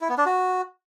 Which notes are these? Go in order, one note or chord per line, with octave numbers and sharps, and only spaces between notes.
E4
B3
D4
F#4